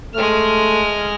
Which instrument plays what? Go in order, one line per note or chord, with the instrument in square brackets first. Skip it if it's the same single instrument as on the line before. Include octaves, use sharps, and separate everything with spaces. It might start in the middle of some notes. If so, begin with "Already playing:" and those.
[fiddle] G#3 F6 [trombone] A3